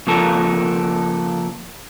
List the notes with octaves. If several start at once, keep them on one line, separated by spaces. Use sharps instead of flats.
C#3 F3 A#3 A4 A#4